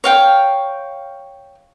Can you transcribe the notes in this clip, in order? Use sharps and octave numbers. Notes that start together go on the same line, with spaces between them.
C#5 F5 G5